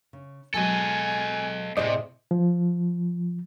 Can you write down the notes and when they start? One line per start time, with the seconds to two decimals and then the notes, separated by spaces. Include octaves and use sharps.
0.13 C#3
0.54 B2 F#3 G#3 A4 D#5 G#5
1.77 E2 A2 C3 G#4 C5 D5 D#5
2.31 F3